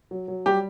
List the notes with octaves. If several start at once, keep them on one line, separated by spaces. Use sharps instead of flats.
F#3
F#3
G3 G4